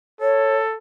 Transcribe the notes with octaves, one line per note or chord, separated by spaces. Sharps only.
A4 C#5